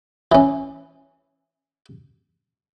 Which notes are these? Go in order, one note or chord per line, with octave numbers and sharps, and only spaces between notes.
E3 C#4